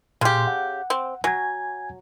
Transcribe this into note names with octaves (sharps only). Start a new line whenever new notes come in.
A#2 C#3 G4 C6
F#5
C4
F#3 G#5 G#6